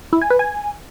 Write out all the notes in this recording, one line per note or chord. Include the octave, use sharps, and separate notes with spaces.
E4
G#5
B4
G#5